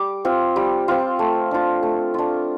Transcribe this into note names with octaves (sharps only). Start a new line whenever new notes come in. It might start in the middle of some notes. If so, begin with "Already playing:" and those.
Already playing: G3 D6
C4 F4
G3
C4 F4
A3
D4 F4
A3
D4 F4